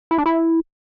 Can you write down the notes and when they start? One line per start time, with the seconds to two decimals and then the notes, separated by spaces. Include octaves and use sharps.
0.11 E4
0.18 D4
0.26 E4